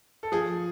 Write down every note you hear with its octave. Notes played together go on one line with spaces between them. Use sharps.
A4
F3 G#4